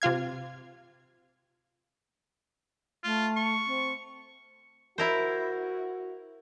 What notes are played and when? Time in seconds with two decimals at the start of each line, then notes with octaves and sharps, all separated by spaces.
0.02 C3 F4 F5 G#6
3.04 A3 F4
3.37 C#6
3.66 C4
4.98 E4 F#4 A#4 C5